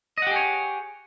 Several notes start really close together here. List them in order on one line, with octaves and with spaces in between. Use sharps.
D#5 F#5 G4 G#4 C#5